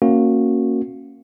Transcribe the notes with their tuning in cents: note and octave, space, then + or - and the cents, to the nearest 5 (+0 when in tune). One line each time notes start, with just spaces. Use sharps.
A#3 -15 C#4 -20 F#4 -15